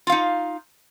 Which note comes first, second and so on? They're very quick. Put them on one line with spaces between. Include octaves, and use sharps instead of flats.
F4 F5 D#4